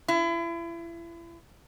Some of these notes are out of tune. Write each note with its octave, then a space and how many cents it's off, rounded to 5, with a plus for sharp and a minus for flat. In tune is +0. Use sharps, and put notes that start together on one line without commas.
E4 +35